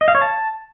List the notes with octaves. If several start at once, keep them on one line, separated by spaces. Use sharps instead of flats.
D#5
F5
C#5
A5